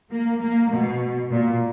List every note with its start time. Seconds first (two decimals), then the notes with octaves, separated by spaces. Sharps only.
0.11 A#3
0.41 A#3
0.70 B2
1.30 A#2